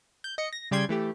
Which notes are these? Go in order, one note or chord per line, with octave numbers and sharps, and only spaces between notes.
G6
D#5 C#7
A#6
C#3 G3 D5 G5 C6 G#6
E3 A3 G4